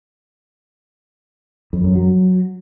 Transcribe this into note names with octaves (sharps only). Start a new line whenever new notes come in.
F2
F#2
F#3